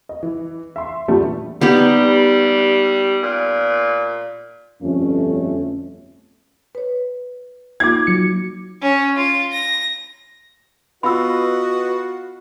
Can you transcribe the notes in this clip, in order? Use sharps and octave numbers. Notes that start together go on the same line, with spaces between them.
D#5
E3
E5 C6
E2 G2 A#2 G3 A3
G3 B3 D#4 G4
A#2
G1 F2 B2 A3 C#4
B4 C#5
A#3 D#4 F4 D6 G#6
F#3 C#7
C#4
F4
A#6
B3 F4 F#4 B4 D#5 B5 E6